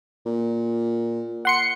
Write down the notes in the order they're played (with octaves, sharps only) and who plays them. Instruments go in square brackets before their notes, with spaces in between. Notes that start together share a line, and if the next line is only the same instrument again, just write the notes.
[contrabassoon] A#2
[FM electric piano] F#5 C6 C#7